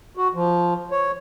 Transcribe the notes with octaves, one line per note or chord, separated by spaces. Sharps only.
F#4
F3
C#5